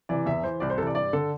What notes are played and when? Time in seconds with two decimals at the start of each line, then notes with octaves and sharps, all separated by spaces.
0.09 C3 E3 D5
0.26 E2 E5
0.43 E3 C5
0.60 C2 D5
0.70 C5
0.77 C3 A4
0.82 E3 D5
0.95 G2 D5
1.13 D3 A4